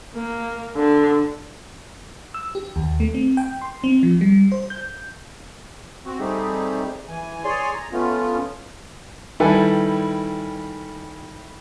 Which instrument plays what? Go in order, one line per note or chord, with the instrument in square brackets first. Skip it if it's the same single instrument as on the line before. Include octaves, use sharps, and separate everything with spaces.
[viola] A#3
D3
[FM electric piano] E6
G4
D#2
A3
C4
G5
C6
C4
F3
G3
C5
G6
[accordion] C4 F#4
G3 A3 C4 D#4 G4 G#4
E3 G#5
G#4 C#5 D5 G#5 C6
A#5
A3 B3 C#4 F4
[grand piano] D#3 G3 E4 A4 B4 G#5